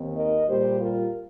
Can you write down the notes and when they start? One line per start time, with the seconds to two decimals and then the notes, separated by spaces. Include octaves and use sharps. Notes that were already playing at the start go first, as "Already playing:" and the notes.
Already playing: D#2 D#3 C4
0.14 A#4 D#5
0.47 A#2 G3 A#3 G4 C5
0.79 F4 A#4